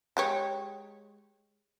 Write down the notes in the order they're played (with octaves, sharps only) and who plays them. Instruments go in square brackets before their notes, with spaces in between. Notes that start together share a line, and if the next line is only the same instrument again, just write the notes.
[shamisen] G#3 G4 C#5